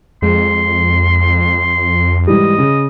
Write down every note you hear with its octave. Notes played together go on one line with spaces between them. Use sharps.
F2 G#3 C6
G#2 E3 G3 D#5
C#3